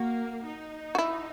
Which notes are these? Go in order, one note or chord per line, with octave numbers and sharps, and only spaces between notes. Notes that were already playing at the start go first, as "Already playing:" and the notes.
Already playing: A#3 F#4
D#4
F#4
E4